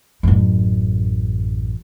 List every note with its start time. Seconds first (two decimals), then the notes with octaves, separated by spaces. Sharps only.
0.23 A1 F#2